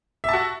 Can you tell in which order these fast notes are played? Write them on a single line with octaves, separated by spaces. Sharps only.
E5 A5 F#4